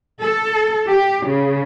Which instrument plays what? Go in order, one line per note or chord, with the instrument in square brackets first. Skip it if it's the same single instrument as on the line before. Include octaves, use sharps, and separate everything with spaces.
[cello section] A4
G4
C#3